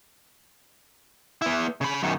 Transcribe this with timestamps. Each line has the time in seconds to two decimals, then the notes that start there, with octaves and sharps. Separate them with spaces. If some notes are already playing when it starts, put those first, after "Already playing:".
1.42 B3 E4
1.81 C#3 B5
2.03 F#2 D#3